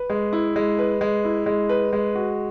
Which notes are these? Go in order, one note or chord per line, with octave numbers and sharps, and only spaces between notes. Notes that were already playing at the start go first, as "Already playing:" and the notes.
Already playing: B4
G#3
E4
G#3
B4
G#3
E4
G#3
B4
G#3
F#4